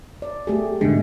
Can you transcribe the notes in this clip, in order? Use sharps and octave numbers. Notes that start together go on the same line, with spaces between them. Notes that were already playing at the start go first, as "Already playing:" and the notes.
D5
A3 G4 G#4
G#2 B2 D3 G#3